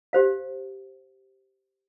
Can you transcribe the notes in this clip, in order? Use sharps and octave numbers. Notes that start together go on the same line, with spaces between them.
G4 C5 F5